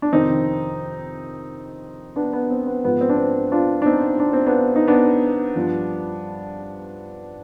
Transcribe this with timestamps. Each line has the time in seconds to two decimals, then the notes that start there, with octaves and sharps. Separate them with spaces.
0.02 D4
0.12 F2 C3 D#3 C4 D#4
2.16 B3 D4
2.33 B3
2.50 C4
2.67 B3
2.84 G#2 F3 B3
3.01 C4
3.09 D4
3.18 C4
3.52 D4 F4
3.82 D4
3.86 C4 D#4
4.20 D4
4.33 C4
4.46 B3 D4
4.76 D#4
4.87 B3 D4
5.56 G2 F3